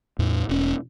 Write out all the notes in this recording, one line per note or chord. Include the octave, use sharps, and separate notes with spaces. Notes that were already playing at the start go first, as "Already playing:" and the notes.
E2 A2
E1 C#4